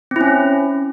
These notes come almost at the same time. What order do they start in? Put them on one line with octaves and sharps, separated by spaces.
C4 E4 C#4